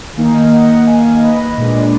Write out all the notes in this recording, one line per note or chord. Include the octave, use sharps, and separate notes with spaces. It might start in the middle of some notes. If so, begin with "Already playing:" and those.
D#3 A#3 D#4 F5 G#5
D#5 F#5
F5 G#5
F5
B4 D#5
A#2 G#3 D4